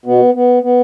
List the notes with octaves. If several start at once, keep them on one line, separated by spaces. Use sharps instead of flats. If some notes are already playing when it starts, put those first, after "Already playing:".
B2 B3
B3
B3